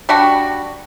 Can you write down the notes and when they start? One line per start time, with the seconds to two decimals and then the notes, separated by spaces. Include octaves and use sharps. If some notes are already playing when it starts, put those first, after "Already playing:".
0.09 G3 D4 F#4